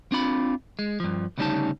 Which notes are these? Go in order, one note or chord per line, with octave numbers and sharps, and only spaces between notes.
C4 D4 F4 B5
G#3
G2 F3
D2 C#3 G3 C#4 D#4 A5